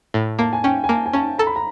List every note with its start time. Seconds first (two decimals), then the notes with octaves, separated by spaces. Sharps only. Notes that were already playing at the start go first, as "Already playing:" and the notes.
0.14 A2
0.39 A#3 A5
0.53 G#5
0.64 C#4 G5
0.84 G#5
0.89 A#3 A5
1.06 G#5
1.13 C#4 A5
1.39 A4 A#5
1.47 B5
1.56 A#5